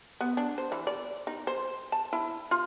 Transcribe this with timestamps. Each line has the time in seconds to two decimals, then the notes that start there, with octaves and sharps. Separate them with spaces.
0.21 B3
0.37 D4
0.58 C5
0.72 E3
0.87 D5
1.27 D#4
1.47 C5
1.92 A5
2.13 E4
2.51 F4